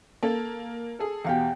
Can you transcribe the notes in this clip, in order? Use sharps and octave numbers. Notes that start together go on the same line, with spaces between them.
A#3 A4
G#4 A4
E2 B2 G4 F5 F#5